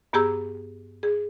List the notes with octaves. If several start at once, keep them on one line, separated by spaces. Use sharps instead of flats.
G2 B3 G4 G#4 A#5 E6
G#4